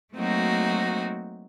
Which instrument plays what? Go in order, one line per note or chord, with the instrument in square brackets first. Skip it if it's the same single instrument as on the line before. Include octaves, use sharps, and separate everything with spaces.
[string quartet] F#3 A3 A#3 C4 D#4 F#4